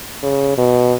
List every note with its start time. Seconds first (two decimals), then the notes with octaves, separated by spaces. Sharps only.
0.23 C#3
0.58 B2